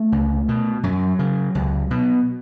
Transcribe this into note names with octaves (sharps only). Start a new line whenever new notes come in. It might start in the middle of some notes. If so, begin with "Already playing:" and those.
Already playing: A3
C#2
B2
F#2 F#3
C#3
C#2
B2